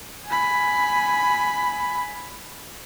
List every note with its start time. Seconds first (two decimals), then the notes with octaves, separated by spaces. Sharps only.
0.28 G#5 B5